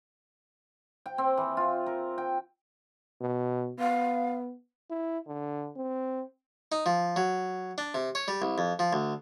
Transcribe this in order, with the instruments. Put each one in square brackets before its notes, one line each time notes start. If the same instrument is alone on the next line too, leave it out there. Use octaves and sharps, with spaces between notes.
[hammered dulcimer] G5
C4
E3
F4
A#4
G5
[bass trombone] B2
[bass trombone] B3 [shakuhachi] F5
[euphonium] E4
D3
C4
[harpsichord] D#4
F3
F#3
D4
C3
C#5
G3
C2
F2
F3
D2